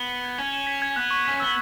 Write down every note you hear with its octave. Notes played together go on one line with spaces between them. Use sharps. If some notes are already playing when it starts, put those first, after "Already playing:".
Already playing: B3
C#7
G#6
C#4 G#6
E7
B6
G#6
B3 F#6
C#6
C#4 B6
B3 E6